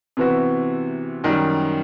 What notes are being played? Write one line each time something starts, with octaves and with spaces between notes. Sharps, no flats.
C3 E3 B3 F#4
F#2 D#3 G3